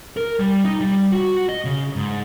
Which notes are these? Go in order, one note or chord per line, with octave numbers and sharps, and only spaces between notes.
A#4
G3
D#4
G3
F#4
D#5
C#3
G#2